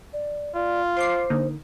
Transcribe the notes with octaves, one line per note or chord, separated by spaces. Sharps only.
D5
F4 D5
C5 C6 D6 C7
D3 A#3 D#4